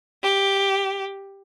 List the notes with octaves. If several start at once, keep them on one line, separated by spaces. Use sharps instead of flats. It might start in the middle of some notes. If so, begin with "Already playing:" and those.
G4